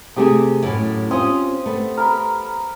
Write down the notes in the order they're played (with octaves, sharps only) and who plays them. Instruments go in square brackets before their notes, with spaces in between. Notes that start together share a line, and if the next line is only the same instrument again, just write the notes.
[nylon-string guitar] C3 A3 G#4 [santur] G4 D#6
[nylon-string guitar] F#2 A2
[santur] C4 D#6 [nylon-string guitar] C#4 F4
[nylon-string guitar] A3 B3
[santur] A#4 B5